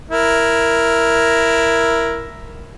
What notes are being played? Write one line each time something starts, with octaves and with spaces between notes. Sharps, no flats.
E4 A#4